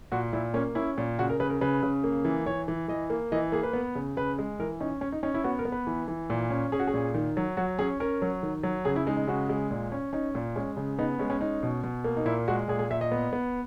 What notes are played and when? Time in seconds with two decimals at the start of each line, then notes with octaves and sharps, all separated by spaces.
0.12 A#2 F#4
0.33 A#2 E4
0.54 A#3 C#4
0.75 C#4 E4
0.98 A#2
1.19 C#3 F#4
1.29 A#4
1.40 C#3 B4
1.50 A#4
1.61 C#3 B4
1.83 C#3
2.04 A#3
2.25 E3
2.46 E3 C#5
2.68 E3
2.88 E3 D#5
3.10 A#3
3.32 E3 D#5
3.52 A#3 G#4
3.63 B4
3.73 B3
3.95 C#3
4.17 C#3 B4
4.38 G#3
4.60 E3 A#4
4.80 C#4 D#4
5.01 C#4
5.12 D#4
5.23 C#4 D#4
5.34 E4
5.44 B3 F#4
5.59 A#4
5.65 B3
5.72 B4
5.87 E3
6.08 E3
6.30 A#2
6.50 C#4
6.72 C#4 G#4
6.79 F#4
6.87 G#4
6.94 A#2
7.14 D#3
7.37 F#3
7.57 F#3 F#4
7.79 C#4 G#4
8.00 C#4 A#4
8.22 F#3
8.43 D#3
8.63 F#3
8.85 C#3 G#4
8.96 E4
9.07 G#3 D#4
9.17 D#4
9.27 C#3 F#4
9.49 G#3
9.71 A#2
9.92 C#4
10.13 C#4 D#4
10.35 A#2
10.56 G#3 C#4
10.77 C#3
10.99 B3 D#4
11.19 G#3 C#4
11.30 C#4
11.41 C#4 D#4
11.63 B2
11.84 B2
12.04 A#3
12.17 D#4
12.26 A#2 E4
12.48 G#3 F#4
12.68 A#2 G#4
12.79 G#4
12.91 A#2 E5
13.01 D#5
13.12 B3
13.33 B3